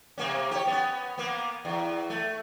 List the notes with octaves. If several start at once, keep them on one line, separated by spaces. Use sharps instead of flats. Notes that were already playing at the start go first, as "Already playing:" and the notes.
C3 A#3 C#4
G4 C#5
B3 C#4
A#3 B3
E2
A3